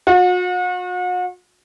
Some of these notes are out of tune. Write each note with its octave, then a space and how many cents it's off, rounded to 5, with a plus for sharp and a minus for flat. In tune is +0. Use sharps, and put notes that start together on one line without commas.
F#4 -40